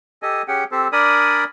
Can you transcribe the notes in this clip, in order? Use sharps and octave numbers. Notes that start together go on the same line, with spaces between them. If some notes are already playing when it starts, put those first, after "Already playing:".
G4 A4 D#5 G#5
C#4 G4 G#4 F#5 G5
C4 G4 A4 C5
D4 A#4 D5 G#5 B5 D#6